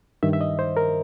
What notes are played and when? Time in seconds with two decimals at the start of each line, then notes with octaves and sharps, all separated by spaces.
0.23 G2 D#3 E5
0.33 E5
0.41 D#5
0.59 C5
0.77 A#4